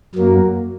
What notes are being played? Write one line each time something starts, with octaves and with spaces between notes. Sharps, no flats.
F#2 F#3 A#3